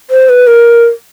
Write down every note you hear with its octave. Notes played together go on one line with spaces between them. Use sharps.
C5
B4
A#4